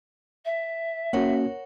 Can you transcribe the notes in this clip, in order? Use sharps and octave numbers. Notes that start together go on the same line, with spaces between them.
E5
A#3 C#4 F#4 A#4 C#5 F#5